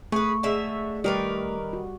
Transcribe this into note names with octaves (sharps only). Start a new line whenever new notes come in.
A3 G#4 B4 C#6
D3 G#3 E5
D#3 G3 G4 A#4 B4 D5
F#4